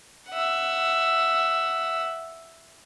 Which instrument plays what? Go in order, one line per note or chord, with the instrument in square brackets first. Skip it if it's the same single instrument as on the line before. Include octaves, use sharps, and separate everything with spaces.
[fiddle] E5 F#5